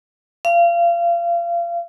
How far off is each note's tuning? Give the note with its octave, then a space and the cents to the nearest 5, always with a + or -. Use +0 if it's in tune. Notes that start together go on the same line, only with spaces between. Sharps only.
F5 -30